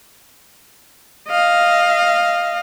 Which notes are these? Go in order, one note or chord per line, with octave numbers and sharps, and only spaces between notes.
D#5 F5